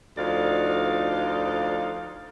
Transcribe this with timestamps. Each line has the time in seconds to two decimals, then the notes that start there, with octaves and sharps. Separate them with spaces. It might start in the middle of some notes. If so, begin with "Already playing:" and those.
0.18 D2 F3 D#4 D5 F5